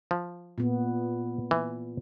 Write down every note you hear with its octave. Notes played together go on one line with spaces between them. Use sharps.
F3
A#2 B3
E3